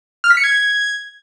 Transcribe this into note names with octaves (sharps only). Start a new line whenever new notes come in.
F6
B6
C#7
G#6